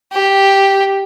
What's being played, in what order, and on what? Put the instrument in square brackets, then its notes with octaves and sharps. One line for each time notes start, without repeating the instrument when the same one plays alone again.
[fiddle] G4